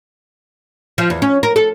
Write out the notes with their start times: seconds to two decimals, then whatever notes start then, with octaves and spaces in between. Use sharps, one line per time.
0.98 F3
1.10 E2
1.22 C#4
1.43 A#4
1.56 A4